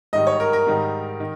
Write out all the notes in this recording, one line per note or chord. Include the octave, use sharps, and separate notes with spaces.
G#2 D#3 G3 D#5
C#5
A#4
A#4
G#2 D#3 G3
D#3